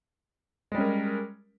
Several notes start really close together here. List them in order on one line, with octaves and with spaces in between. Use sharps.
G#3 G3 C#4 A#4